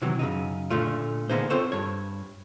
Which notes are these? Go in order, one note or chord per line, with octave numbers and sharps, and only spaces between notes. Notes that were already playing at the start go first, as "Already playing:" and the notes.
C3 D#3 E3 F#3
F#2 C#3 D#4
A#2 D3 A3 F4
D3 A#3 B3 D#4 G#4 C5
C4 F4 A4 C5 C#5
G2 C#5